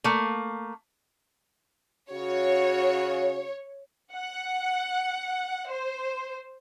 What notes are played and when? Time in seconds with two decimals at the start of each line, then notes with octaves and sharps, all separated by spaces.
0.04 A3 A#3
2.11 C#3 F#4 C#5
4.13 F#5
5.70 C5